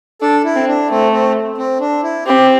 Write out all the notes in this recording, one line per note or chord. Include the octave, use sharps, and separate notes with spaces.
D4 A4
E4
C4
D4
A3 C4
C4
C4
D4
E4
C4 G4